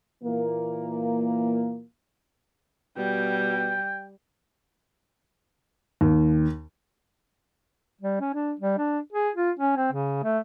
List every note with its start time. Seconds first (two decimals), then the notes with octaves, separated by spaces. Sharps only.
0.24 A#2 E3 A#3
2.97 B2 G3 G5
6.01 D#2
8.01 G3
8.20 C#4
8.34 D4
8.60 G3
8.78 D4
9.12 G#4
9.35 F4
9.59 C#4
9.77 C4
9.92 C#3
10.23 A3